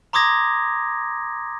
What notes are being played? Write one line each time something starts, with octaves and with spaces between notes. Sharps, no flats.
A#5 C6 D6 D#6 G#6 A#6